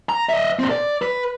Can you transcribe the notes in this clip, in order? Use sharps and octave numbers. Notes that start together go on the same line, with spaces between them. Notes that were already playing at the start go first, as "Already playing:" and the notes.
A#5
D#5 E5
A#2 C4
D5
B4